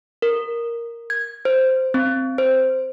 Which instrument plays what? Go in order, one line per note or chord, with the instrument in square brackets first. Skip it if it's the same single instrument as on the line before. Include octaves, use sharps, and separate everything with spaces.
[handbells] A#4
G#6
C5
C4
C5